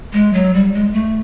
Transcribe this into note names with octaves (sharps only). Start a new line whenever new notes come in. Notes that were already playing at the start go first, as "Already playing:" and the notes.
G#3
F#3
G3
G#3
A3